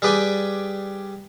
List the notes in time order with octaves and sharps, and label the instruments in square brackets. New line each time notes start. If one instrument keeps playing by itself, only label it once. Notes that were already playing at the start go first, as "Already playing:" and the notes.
[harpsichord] G3 G#4 B4 D5 G5 G#5